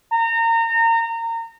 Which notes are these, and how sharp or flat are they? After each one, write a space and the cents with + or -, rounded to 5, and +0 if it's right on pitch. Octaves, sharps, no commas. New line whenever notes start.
A#5 -30